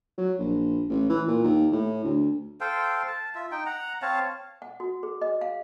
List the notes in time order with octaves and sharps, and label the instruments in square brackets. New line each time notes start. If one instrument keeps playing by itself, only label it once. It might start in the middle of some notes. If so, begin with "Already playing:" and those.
[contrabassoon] F#3
A#1
A1
E3
A#2
D#2
A2
D2
[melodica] A4 C5 F5 G5
A5
F4 E5
D#4 G5
F#5 A#5
C4 C#5 F5 A5
[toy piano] F#5
F#4
G#4
D#5
F5